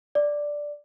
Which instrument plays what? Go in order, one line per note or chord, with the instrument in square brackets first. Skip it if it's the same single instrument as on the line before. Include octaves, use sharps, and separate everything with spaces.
[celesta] D5